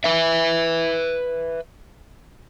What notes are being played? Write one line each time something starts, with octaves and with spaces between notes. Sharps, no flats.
B4 E5